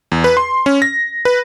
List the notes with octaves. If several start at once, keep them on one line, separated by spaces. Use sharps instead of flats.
E2
B4
C6
C#4
A#6
B4